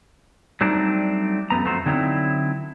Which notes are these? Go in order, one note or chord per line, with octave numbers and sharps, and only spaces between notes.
F#3 G3 A3 C4 D4 D#4
F#2 A3 B3 A#5
F2 A3 F#4 C5 A#5
D3 F#3 C4 D#4 E4